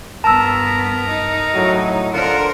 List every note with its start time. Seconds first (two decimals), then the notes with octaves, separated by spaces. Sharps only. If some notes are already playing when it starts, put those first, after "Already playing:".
0.24 G2 B3 A#4 A5 A#5 E6
1.08 D#4
1.54 A2 F#3
2.14 D3 F4 A#4 C5 F#5